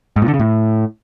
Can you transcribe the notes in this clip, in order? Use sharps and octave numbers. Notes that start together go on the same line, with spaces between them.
G#2
A#2
D3
C#3
A2